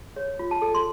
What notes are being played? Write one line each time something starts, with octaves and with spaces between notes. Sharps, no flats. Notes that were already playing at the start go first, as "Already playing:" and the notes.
C#5
F4
A5
A4
C6